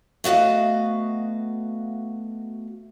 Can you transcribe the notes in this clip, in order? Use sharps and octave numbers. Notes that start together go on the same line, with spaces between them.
A3 B3 F#4 D#5 F5